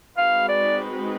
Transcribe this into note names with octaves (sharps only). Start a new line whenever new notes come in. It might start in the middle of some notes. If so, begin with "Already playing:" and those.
G#3 C4 D#4 F#4 B4 F5
D5